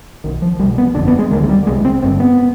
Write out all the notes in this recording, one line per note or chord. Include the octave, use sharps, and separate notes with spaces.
B1 B2 D#3
F3
C2 G3
B2
B3
G1 F2 D3 D4
B3
G#3
D2 D3 D#3
G#3
G3
C2 C3 G#3
C4
G#1 G2 D3 C4
B3